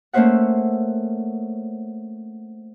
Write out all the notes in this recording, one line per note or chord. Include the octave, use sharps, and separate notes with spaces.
A3 A#3 C#4 C5 E5 F#5